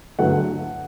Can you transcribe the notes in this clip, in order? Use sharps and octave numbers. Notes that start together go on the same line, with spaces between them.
G1 G2 F#3 A3 F#5